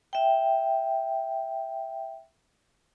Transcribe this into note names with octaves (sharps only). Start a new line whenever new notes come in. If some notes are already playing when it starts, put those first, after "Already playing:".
E5 G5